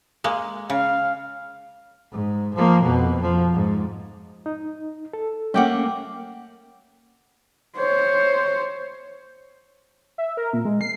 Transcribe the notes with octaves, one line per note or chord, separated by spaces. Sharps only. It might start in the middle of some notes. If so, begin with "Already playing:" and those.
G#3 A#3
C#3 F5
G#2
F3 A#3
F2 B2
F3
G#2
D#4
A4
A3 A#3 C#4 F#5 G5 D6
C5 C#5
E5
A#4
A#2
G#3
C7